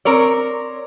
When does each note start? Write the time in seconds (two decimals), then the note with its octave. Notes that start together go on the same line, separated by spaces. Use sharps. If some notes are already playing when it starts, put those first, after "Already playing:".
0.05 C4 A#4 C#5 D5